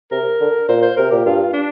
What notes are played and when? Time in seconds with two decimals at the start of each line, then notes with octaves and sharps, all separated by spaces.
0.11 C3 A#4
0.40 D3
0.68 A#2 C5
0.83 C5
0.97 C3 A#4
1.11 A#2 G4
1.25 G2 F4
1.54 D4